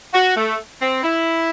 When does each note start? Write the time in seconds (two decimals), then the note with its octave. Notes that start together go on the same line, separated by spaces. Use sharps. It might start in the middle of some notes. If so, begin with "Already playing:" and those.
0.13 F#4
0.36 A3
0.80 C4
1.02 E4